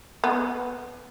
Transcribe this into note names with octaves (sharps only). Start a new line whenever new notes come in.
B3